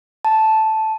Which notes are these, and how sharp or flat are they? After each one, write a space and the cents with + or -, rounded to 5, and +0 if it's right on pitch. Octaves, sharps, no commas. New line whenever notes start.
A5 -5